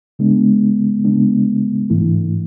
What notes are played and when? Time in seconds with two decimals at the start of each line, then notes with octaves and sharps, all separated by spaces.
0.19 C#3 G#3 B3 D4
1.05 C#3 G#3 B3 D4
1.90 G#2 E3 A3 E4